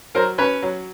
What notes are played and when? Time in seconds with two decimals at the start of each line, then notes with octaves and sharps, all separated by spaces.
0.15 F#3 A#4 C5
0.38 C#4 B4 C#5
0.62 F#3